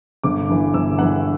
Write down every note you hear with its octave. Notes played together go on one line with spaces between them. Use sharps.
G1 D6
G2 E3
G1 E6
G2 E3 F#5